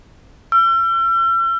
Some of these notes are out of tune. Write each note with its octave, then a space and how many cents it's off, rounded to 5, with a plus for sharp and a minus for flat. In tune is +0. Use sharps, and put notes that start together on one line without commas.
E6 +45